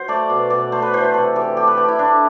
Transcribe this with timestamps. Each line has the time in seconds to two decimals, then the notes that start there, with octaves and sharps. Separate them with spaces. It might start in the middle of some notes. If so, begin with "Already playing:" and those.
Already playing: F#3 C5
0.08 A3 D5
0.30 B2
0.50 B2 D5
0.72 A3 C5
0.82 B4
0.93 E3 C5
1.04 B4
1.14 C3 A4
1.35 E3 G4
1.57 A3 G4
1.67 B4
1.77 A3 G4
1.88 E4
1.99 A3 D4